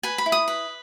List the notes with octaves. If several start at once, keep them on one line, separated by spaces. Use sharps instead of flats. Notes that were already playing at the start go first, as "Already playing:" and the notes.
B4 G#5
B5
E4
D#6
B4